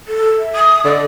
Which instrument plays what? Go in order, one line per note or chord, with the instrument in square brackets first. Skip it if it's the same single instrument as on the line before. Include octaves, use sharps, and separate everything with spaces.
[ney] A4
E5
[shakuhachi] D#6
[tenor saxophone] D3 [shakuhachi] D5 [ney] D#5